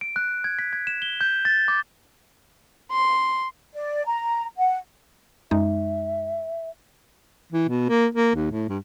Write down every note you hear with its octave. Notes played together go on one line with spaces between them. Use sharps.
D7
F#6
G#6
B6
G#6
E7
G7
G6
A6
D6
C6
D5
A#5
F#5
F#2 G#3 D#4 E5
E3
B2
A#3
A#3
D#2
A2
G2